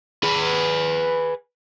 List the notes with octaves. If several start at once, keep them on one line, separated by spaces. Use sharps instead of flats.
G#4 B4